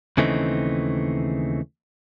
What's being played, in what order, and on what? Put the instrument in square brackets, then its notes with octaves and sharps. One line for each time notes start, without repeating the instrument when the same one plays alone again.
[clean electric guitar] D#2 C#3 E3 A3 C4 D#4